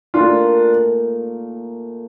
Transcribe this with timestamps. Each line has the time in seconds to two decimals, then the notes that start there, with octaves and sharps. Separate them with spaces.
0.14 A#2 A3 D4 D#4 F4 A#4